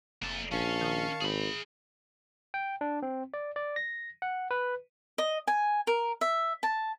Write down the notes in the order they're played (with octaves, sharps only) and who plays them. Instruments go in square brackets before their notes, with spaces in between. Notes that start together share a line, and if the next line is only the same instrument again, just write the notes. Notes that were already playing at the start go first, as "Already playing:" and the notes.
[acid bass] F1 [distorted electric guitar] A#3 A5
[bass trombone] A#1 [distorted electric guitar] C#4 [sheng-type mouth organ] F5 A5 C#6
[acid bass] D#3
[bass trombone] G#1 [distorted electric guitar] G#4 B5
[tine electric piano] G5
D4
C4
D5
D5
A#6
F#5
B4
[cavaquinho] D#5
G#5
A#4
E5
A5